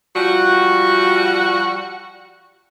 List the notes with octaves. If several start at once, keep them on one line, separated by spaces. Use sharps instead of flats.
F3 G3 F#4